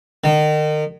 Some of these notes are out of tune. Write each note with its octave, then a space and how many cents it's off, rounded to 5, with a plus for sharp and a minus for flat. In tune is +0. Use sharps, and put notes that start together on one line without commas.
D#3 -35